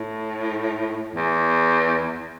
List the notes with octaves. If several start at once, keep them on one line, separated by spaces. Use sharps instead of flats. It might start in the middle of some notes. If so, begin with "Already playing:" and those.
Already playing: A2
E2